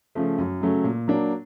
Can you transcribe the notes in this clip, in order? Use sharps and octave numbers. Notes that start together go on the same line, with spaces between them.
C#3 F3 A3
F#2
C#3 F#3 A3 C#4
A#2
F#3 A#3 D4